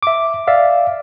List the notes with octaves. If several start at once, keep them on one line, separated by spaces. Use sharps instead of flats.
E5 D6
D5 E5 F5